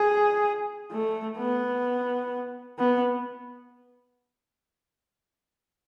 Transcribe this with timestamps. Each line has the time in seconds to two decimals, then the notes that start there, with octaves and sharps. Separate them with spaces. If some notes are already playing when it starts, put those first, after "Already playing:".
Already playing: G#4
0.92 A3
1.38 B3
2.79 B3